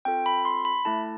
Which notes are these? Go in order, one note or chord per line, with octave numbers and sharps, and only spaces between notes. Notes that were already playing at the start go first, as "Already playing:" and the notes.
C4 F4 A4 G5
B5
C6
B5
A3 E4 A4 A5